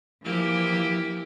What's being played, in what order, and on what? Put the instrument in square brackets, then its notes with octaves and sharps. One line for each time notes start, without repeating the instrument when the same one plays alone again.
[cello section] E3 F3 [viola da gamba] A#3 E4 G4